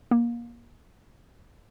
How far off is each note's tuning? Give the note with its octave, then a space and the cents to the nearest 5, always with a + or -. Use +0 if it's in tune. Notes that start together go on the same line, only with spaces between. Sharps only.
A#3 +25